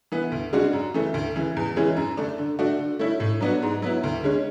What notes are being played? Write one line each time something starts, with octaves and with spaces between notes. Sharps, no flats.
E3 B3
D2
C#3 G#3 D4 F#4
F#2
C#3 E3 A3
D2
C#3 E3
E2
C#3 E3 G#3 C#4
F#2
D3 A3 D4
D3
A3 D4 F#4
D3
A3 C#4 E4
A2
F#3 B3 D4 F#4
G#2
F#3 B3 E4
D2
D3 G#3 C#4